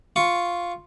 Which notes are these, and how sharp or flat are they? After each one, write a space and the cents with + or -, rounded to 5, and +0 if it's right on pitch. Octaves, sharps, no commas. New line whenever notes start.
F4 +0 C#6 +0